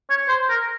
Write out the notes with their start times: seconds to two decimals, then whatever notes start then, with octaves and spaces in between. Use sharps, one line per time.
0.10 C#5
0.28 C5
0.49 A#4